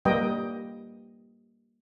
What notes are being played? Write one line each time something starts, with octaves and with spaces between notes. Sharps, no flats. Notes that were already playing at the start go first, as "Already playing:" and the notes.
G3 A#3 G4 B4 D#5 G5